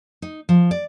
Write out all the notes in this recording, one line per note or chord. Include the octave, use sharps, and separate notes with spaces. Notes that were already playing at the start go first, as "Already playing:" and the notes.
D#4
F3
D5